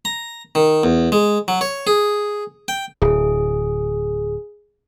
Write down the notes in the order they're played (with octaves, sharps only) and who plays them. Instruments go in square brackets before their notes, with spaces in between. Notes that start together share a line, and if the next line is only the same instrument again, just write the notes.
[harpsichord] A#5
D#3
E2
G#3
F#3
C#5
G#4
G5
[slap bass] D1 [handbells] G#4